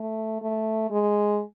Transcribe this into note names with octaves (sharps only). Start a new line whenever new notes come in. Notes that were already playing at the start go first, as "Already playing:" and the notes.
Already playing: A3
A3
G#3